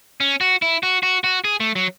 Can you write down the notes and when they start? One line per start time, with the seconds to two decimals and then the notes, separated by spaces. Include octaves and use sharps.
0.20 C#4
0.41 F#4
0.62 E4
0.83 F#4
1.03 F#4
1.24 F#4
1.44 G#4
1.60 A3
1.76 F#3